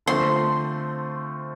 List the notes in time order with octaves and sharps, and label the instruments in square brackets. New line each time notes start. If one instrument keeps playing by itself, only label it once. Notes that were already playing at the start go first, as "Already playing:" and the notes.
[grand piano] D3 F3 A3 C4 [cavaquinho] C6